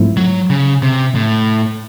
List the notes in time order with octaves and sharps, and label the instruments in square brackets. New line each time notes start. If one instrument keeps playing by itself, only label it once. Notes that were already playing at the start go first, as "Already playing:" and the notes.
Already playing: [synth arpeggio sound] G#2 F3 A3 C4 E4
[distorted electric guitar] F#3
C#3
C3
A2